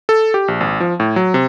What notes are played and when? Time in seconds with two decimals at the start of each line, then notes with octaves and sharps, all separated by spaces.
0.09 A4
0.34 G4
0.48 A#1
0.61 G#1
0.80 F3
1.00 A2
1.16 F#3
1.34 C3